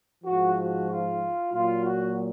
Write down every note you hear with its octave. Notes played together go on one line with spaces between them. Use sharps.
G#2 F3 F#4
F#4
F4
A#2 F#3 F4
F#4